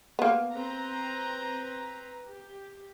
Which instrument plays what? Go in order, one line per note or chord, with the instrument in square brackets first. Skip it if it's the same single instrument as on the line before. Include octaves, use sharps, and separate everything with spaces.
[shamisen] A#3 B3
[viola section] C4 B4 A#5
G4